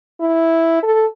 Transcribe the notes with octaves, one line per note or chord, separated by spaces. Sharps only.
E4
A4